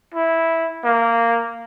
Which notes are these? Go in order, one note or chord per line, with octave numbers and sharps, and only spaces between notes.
E4
A#3